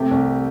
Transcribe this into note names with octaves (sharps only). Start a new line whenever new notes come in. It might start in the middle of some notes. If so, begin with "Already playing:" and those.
Already playing: C3 A3 G4
C2